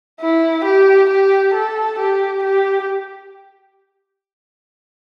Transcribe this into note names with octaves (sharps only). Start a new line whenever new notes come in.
E4
G4
G4
A4
G4
G4